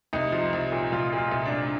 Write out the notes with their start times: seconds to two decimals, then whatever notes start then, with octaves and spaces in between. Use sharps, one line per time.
0.13 C2 D#4
0.32 F3
0.53 C2
0.72 A#2
0.92 C2 F4
1.13 A#2
1.18 F4
1.32 C2
1.46 D4
1.52 C2